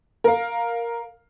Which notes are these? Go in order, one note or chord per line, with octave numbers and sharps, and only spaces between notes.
A#4 F5